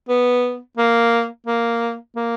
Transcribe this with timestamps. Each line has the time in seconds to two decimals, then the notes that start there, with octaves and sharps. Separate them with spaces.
0.09 B3
0.77 A#3
1.46 A#3
2.16 A#3